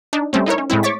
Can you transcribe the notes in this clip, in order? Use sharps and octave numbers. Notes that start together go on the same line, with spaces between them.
D4 D#4
G3 A3 C4 C#4
D#4 E4 A#4 C#5
C#4
A2 G#3 C4 E4
C#5 C#6 D6 A6 B6